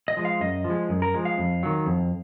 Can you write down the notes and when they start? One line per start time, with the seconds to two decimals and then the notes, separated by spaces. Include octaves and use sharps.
0.08 D#5
0.17 F3 G#3
0.25 F5
0.40 F#2 D#5
0.64 F3
0.70 G#3
0.89 F#2
1.02 A#4
1.14 F3 G#3
1.25 F5
1.38 F2
1.63 D#3 F#3
1.86 F2